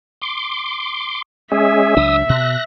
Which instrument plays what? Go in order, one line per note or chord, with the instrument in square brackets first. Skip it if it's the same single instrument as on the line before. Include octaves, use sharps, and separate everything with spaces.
[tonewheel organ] C6 D6
[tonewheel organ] G#3 C#4 G#4 [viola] E5
[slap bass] C#2 F#3 D4 [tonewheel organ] D#6 E6
[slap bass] B2 [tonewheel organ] F#6 A#6